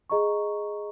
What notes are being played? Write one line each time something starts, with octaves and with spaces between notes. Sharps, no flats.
G#4 D#5 A#5 C#6